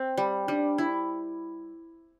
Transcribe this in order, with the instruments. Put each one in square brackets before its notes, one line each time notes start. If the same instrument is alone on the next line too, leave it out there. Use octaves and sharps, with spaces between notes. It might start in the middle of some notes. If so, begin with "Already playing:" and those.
Already playing: [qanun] C4
G3
[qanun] G3 [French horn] D4
[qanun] E4